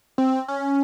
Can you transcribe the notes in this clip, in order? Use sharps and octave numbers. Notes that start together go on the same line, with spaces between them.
C4
C#4